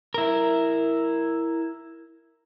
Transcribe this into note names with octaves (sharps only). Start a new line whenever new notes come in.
E4 A#4